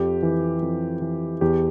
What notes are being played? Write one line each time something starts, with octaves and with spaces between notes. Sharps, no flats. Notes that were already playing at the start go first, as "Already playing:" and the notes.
Already playing: F2 G4
E3
F2
E3
E2 G4